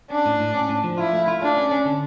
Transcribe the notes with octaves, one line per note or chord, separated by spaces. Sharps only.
C#4 D4
A2
A2
C#4
A2
F3
E4 F4
A3
F4
A3 D4
C#4
C#4
D3